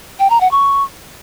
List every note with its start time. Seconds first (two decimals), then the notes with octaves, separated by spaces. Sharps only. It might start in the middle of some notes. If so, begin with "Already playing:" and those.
0.20 G5
0.30 A#5
0.41 F#5
0.51 C#6